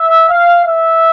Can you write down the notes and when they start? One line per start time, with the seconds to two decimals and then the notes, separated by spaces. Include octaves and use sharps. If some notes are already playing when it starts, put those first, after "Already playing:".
Already playing: E5
0.29 F5
0.66 E5